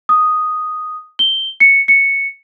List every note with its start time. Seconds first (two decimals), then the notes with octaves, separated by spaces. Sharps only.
0.09 D#6
1.19 G7
1.60 C#7
1.88 C#7